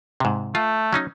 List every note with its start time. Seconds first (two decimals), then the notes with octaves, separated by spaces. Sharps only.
0.20 G#2 C3
0.55 A3 F4
0.93 F#3 C#4 D#4